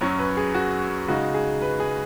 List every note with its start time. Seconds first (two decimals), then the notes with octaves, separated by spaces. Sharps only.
0.01 F#2 F#3 C#4 C#5
0.19 B4
0.37 G#4
0.54 F#4
1.08 C#3 G#3 D#4 F#4
1.34 G#4
1.61 B4
1.80 G#4